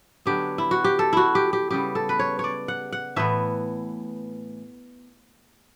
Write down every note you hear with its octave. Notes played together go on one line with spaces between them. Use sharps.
D3 F#3 B3 D4 G4
E4
F#4
G4
A4
E4 F#4
G4
G4
C#3 G3 B3 G4
A4
B4
C#5
C#5 D5
F#5
F#5
A2 E3 B3 E5